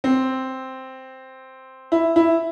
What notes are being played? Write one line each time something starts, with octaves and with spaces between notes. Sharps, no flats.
C4
E4
E4